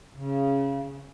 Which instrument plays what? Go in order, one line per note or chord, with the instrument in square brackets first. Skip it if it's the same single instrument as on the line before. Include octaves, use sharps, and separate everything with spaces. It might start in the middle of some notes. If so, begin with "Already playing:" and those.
[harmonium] C#3